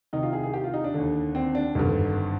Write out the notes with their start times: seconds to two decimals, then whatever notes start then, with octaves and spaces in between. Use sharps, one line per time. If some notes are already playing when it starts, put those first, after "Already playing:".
0.13 C2 C3 D#3 D#4
0.23 F4
0.33 G#4
0.43 G#4
0.54 G4
0.64 F4
0.74 D#4
0.84 D4
0.94 D#2 D3
1.35 C4
1.55 D4
1.75 G#1 G2 D3